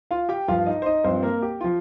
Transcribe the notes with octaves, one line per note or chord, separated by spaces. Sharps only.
F4 F5
G4 G5
G2 F3 F4 F5
D#4 D#5
C5
D#4 D#5
G2 F3 C4 C5
A#3 A#4
G4
F3 F4